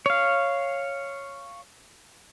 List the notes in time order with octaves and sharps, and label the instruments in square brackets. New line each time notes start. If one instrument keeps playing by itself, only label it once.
[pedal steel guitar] C#5 F5